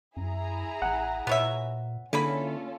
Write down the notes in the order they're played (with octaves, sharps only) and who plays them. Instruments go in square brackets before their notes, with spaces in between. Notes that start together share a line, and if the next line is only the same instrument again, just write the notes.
[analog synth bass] F#2 [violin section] E4 G#4 A#5
[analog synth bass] A1 [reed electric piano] F#5
[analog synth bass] A#2 [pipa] B3 C#5 E5
[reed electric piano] D3 [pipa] E3 G#4 B5 [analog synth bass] A#3 [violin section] C#4 F4 A4